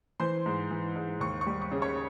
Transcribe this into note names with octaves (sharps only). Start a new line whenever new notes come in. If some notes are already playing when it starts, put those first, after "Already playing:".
E3 C5 C6
G#2
E3
G#2
D#2 C#6
C#6
G3
C#6
C#3
C#5 C#6